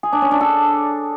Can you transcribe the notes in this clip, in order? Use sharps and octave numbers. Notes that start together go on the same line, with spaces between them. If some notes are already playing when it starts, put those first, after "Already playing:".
G#4
D4
C#4
D4
A4